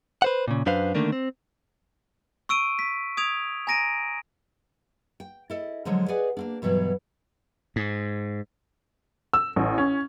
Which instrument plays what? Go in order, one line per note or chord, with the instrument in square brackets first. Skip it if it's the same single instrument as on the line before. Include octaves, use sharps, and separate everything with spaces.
[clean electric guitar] B4 C5 F#5
A#2 C#3
F#2 D4 B4 C5 F5
D3 D#3 A3 A#3 D4
C4
[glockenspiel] C#6 E6 D7 D#7
B6
D#6 G#6 D7 F7
G#5 A#5 A#6 D7 D#7
[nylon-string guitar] G5
E4 A4 D#5
D3 F3 F#3 G#3 A4
G#4 B4 D5 D#5 F#5 G#5
A#3 C4 D4
G2 B2 E3 F#3
[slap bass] G#2
[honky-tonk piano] E6
A1
C#4